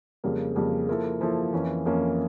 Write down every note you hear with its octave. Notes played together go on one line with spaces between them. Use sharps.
F2 C#3 G3 A#3
F2 C#3 G3 A#3
F3 A#3 E4 A4
F3 A#3 E4 A4
F2 E3 A#3 C#4
F2 E3 A#3 C#4